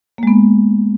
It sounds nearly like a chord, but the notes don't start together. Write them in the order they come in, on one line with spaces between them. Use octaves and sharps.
A#3 G#3 B3